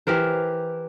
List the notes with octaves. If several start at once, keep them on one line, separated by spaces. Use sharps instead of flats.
E3 G4 A#4 C5